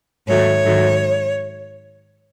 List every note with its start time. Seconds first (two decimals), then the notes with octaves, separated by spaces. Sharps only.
0.27 G#2 D#3 F#3 A3 C#5
0.65 G#2 D#3 F#3 A3